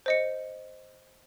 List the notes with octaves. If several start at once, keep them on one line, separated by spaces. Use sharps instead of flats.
C5 D#5 C#7